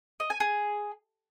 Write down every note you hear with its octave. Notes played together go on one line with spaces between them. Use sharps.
D#5
G#5
G#4